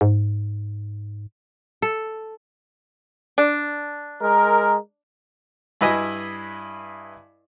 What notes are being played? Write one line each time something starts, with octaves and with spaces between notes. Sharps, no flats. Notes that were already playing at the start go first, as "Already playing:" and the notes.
G#2
A4
D4
G#3 A#4
G2 E4 B4 D#5 G#5 D#6